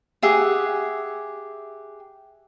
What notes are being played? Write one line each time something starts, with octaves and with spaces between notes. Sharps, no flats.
G4 G#4 E5 F#5